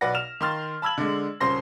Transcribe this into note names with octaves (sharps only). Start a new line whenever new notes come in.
B1 B4 D5 F#5 A#6
F6 E7 F7
D#3 C6 F6 A6
A5 B5 E6 G#6 F#7
D3 G#3
D#1 C#3 C5 C6 A#6